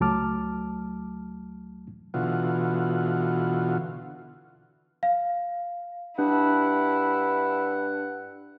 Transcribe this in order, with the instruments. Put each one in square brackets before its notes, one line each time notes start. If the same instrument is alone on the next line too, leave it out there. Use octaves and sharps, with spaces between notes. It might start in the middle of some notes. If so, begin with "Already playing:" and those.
[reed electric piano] C#2 F#3 A3 A5 D6 F6
[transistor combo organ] B2 D3 E3 F4 F#4
[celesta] F5
[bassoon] G2 [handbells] D4 [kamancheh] E4 [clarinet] F#5